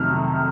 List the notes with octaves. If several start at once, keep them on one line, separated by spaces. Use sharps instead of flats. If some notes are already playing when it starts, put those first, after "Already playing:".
Already playing: F2 C3 D#3 F#3 A3 F6